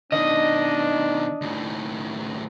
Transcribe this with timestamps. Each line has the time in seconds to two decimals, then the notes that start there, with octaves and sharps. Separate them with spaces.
0.13 B2 D#3 D4 D#5
1.42 D#2 A2